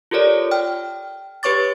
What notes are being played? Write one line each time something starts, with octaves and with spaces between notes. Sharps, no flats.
F4 G4 A4 A#4 C#5 D5
G5 F6
G4 B4 C#5 C#6 D6 A6